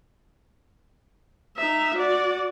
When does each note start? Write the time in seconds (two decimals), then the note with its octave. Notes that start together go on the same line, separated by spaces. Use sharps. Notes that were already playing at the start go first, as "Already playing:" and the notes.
1.57 D#4 E5
1.95 F#4 D5